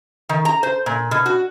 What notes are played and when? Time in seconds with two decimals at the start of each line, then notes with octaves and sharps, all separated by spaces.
0.29 D#3
0.45 A#5
0.63 C5
0.86 A#2
1.11 B2
1.26 F#4